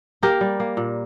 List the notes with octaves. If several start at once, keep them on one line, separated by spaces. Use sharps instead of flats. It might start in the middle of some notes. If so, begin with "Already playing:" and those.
A#3 G4 A#4
G3
A#3
A#2